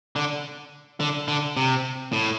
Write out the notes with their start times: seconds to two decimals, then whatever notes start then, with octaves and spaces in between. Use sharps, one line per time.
0.16 D3
1.00 D3
1.28 D3
1.57 C3
2.13 A2